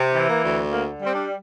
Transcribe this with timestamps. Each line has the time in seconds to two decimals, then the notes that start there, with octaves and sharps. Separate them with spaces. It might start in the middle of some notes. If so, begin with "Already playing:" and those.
Already playing: C3
0.15 E3
0.29 A#3
0.44 D2
0.72 D3 A#3
1.00 G3
1.06 C4
1.15 D4